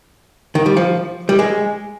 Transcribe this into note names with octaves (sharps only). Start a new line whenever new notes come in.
D#3
G3
F3
G3
G#3